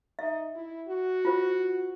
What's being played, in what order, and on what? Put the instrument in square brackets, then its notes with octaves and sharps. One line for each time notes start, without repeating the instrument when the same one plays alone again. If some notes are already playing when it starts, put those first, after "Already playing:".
[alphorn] D#4 [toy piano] E5
[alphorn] E4
F#4
[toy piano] F4 C5